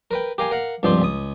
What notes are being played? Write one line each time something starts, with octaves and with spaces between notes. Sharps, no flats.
A#4 B4 G5
G4 A#4 F5 G#5
A#4 F5 F#5
C#2 G2 F3 C4 G4 C5
C#2 D#6